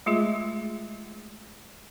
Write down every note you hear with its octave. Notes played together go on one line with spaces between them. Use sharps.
G#3 A3 F4 G#4